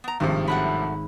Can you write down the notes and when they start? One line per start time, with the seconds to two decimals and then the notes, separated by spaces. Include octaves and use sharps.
0.04 B3 A#5
0.20 G#1 G2 C3 D#3 F3
0.47 F#3 A3 F#5 B5 F#6